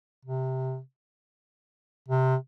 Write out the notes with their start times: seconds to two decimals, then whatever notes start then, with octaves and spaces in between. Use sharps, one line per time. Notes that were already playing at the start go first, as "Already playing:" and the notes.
0.25 C3
2.08 C3